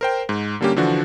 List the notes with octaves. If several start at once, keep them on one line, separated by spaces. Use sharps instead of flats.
A#4 C5 G5
G#2
D3 G3 A#3 C#4 G4
D3 E3 F3 D4 F#4